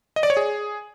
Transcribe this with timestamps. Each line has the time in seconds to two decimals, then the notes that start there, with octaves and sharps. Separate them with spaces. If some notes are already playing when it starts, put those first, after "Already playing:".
0.16 D#5
0.23 D5
0.30 C#5
0.37 G#4